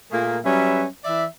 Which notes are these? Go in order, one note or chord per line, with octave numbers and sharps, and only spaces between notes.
A#2 A3 A#3 G#4 A#4
F#3 G3 C#4 B4 E5
E3 D5 E5